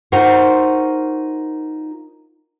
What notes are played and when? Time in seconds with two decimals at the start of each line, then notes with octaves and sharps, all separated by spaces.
0.12 D#4 F4 F#4 A#4 C5